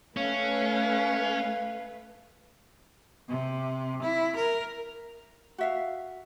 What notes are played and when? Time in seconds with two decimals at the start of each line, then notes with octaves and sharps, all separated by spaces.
0.17 A3 C#4 B4 F5
3.29 C3
4.02 E4
4.35 A#4
5.58 F#4 E5 F5